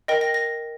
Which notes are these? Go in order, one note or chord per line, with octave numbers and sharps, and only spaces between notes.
A#4 D#5 G5 A#6
A#6
A#6